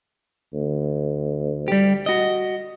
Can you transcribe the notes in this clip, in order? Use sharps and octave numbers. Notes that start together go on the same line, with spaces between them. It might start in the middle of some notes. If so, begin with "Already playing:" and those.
D2
G3 G4
F#4 D#5